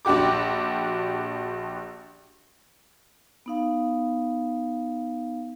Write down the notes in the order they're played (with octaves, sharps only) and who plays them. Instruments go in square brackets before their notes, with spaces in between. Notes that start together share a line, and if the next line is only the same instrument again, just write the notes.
[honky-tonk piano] A#1 D4 F#4 G4 D6
[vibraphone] B3 D#4 F5